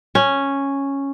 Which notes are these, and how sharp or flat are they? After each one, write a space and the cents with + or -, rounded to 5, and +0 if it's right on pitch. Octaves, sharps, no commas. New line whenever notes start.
C#4 -5